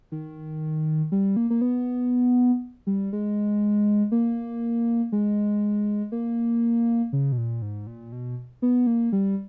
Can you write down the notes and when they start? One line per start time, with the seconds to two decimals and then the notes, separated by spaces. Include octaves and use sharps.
0.12 D#3
1.12 G3
1.37 A#3
1.50 A#3
1.61 B3
2.87 G3
3.13 G#3
4.12 A#3
5.12 G#3
6.12 A#3
7.13 C#3
7.32 B2
7.38 A#2
7.62 G#2
7.87 A#2
8.12 B2
8.62 B3
8.87 A#3
9.13 G3